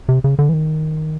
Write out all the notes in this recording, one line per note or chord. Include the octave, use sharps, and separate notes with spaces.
C3
C#3
D3
E3
D#3